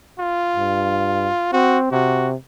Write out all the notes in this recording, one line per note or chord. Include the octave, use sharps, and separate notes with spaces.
F4
G2
C4 F#4
C3 F#4